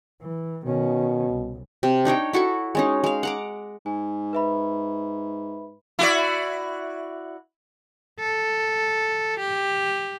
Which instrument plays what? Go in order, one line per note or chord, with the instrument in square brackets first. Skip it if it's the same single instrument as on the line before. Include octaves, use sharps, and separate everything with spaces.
[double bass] E3
[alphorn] B2 [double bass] D#3 C#4
[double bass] C2
[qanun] C3
D4 D#4 C#5 G5
E4 F#4 A4 C#6
G#3 C#4 D#4
G#3 F5
F#5 A#5 D6
[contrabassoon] G#2 [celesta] G#5
[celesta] B4 E5 B5
[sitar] E4 F#4 D5
[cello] A4
G4